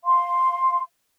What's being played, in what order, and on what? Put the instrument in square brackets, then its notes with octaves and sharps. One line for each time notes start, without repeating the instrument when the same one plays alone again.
[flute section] F5 C6